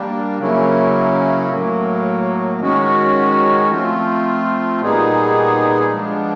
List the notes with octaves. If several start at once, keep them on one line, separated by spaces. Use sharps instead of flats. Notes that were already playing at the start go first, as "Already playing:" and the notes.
Already playing: G3 A#3 D4
C#3 F#3 A#3 C#4 E4
A2 F#3 A#3
D#3 G#3 C#4 F#4
F3 A3 C4 F4
A#2 G3 B3 D#4 G#4
F3 G#3 B3 D4